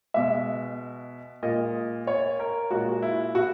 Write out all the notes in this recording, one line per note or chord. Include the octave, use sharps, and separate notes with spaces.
B2 G#3 E5
A#2 G#3 D#5
C#5
A#4
A#2 G#3 F#4
E4
F#4